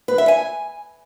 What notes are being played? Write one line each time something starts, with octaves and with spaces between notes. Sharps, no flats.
B4
E5
G#5